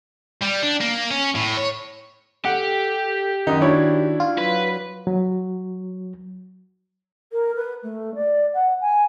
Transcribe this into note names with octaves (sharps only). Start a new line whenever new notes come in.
G3
D4
A#3
C#4
A2
C#5
G4 A4 F#5
F#2 D#3 D#4
D4 E4 F#4 C#5
F4
F#3 B4
F#3
A#4
B4
A3
D5
F#5
G#5